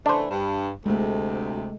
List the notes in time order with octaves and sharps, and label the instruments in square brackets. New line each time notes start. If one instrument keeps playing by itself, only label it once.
[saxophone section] C#3 E3 A3 [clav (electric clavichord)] D4 C5
[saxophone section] G2
[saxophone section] D2 C3 [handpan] G#3 A3